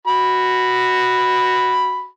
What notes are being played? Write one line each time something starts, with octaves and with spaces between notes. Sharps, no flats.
F#4 B5